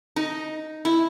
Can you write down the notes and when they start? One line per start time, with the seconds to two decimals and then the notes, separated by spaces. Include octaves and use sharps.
0.16 D#4
0.85 E4